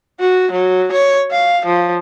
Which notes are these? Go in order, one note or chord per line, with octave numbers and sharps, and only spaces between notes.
F#4
F#3
C#5
F5
F3